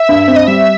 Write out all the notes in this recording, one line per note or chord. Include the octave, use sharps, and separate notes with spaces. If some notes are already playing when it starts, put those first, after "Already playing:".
Already playing: E5
G2
C4
D#5
G3 E5